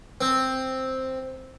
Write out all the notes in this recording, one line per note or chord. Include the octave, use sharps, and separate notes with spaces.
C4